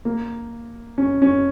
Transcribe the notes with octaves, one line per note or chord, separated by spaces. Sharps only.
A#3
C#4
C#4